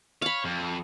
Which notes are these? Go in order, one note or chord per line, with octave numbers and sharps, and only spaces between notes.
C#5 F5 B5
F2